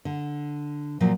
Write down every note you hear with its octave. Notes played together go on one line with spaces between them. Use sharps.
D3
A#2 F3 F#3